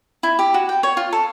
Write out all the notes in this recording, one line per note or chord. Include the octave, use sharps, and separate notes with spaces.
E4
G4
F#4
G5
C#5
F4
A4